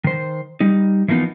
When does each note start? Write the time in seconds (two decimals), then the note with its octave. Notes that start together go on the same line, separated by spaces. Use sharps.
0.04 D#3 C5
0.60 G3 D#4
1.08 E3 F3 A#3 B3 D#4